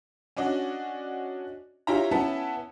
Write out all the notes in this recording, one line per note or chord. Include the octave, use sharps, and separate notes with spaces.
C#4 D4 F#4 D5 D#5
E4 F4 G4 C#5 E5 A#5
B3 C#4 E4 E5 F#5 A5